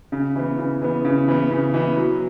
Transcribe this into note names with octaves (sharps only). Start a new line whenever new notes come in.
C#3
E3 B3
C#3
E3 B3
C#3
E3 B3
C#3
E3 B3
F#3